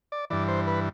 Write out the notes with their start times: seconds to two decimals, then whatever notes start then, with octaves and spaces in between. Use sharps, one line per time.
0.12 D5
0.30 G2 E3 D5
0.48 C5
0.67 B4